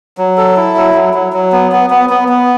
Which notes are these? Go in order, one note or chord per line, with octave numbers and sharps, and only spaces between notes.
F#3
A4
E4
F#3
F#3
F#3
F#3
B3
B3
B3
B3
B3